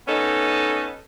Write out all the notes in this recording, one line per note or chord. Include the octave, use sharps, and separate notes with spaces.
B3 C#4 D#4 A4